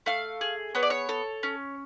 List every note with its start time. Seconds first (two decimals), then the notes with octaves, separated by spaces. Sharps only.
0.06 A3 F5
0.41 G#4
0.75 B3 C#5
0.83 D5
0.90 C#5
1.09 A4
1.43 C#4